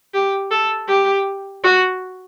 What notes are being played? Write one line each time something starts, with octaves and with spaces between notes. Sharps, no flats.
G4
A4
G4
F#4